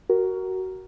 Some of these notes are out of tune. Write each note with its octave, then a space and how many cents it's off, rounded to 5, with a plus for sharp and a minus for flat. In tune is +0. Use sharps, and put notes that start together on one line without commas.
F#4 +15 A#4 +0